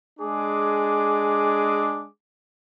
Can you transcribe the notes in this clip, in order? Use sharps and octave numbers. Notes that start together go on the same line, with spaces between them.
G#3 D4 G#4 D6